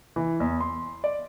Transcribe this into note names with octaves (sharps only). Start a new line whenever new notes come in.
E3
E2
C6
D5